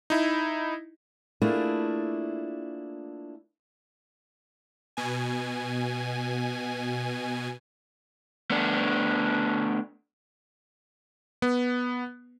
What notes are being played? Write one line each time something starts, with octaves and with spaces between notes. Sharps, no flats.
D#4 E4
A3 A#3 D4 E4 F4 G#4
B2 G#5
A3 B3 D4
B3